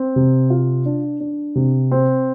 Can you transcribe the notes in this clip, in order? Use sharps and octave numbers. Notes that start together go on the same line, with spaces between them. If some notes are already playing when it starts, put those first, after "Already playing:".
Already playing: C4
C3
F4
D4
D4
C3
C4